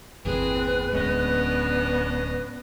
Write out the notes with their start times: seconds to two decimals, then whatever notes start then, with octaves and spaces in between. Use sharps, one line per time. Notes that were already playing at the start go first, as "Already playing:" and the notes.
0.25 G1 E2 A#2 C4 G#4 B4
0.93 D1 G#3 B3 C#4 D4 D#5